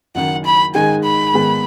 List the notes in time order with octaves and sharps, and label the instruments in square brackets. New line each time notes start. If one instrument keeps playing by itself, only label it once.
[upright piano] F#1 F#2 D#3 [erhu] F#5
[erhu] B5
[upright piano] G#2 D#3 G#3 D#4 G#4 [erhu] G#5
[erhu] B5
[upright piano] G#2 D#3 B3 G#4